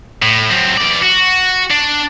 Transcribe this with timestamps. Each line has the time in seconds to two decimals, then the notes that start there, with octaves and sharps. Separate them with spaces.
0.22 A2
0.51 F#2 C4
0.78 E3 D5
1.03 F#4
1.70 D4